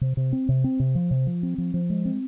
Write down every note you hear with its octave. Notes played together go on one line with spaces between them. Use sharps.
C3
C3
C4
C3
C4
C3
F3
C3
F3
C4
F3
F3
G#3
C4